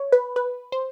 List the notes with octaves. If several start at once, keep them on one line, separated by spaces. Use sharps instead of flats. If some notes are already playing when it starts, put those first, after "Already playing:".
Already playing: C#5
B4
B4
C5